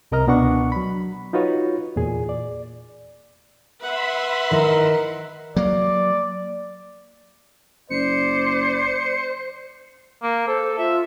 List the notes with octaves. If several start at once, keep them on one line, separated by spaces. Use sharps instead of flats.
C2 C3 A#4 D#5 A#5 F6
C#2 B2 B3 D4 F#5 C#6
F#3 B5
D#4 F4 F#4 B4 C#5
E2 A#2 G#4
D5
B4 E5 F#5 B5 C6
D#3 E4 A#4 D#5
F#3 A#3 D5
F#1 C5 D5 C#7
A#3
A4 C5
F4 E5